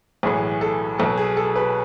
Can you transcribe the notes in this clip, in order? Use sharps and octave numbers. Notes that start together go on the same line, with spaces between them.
B1 A2 E3 G#4
A4
B1 B2 A4
G#4
A4
B4